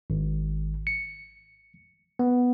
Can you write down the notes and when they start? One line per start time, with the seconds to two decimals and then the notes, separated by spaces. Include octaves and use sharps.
0.10 G#1
0.87 C#7
2.19 B3